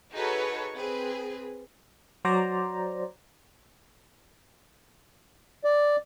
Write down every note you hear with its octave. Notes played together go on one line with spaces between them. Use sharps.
D#4 F#4 G#4 A4 B4 C#5
C4 G#4 B4
F#3 C5 D5 A#5
D5